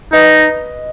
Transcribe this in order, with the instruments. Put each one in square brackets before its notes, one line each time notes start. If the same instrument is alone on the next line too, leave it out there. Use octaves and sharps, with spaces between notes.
[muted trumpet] D#4 [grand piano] B4 D#5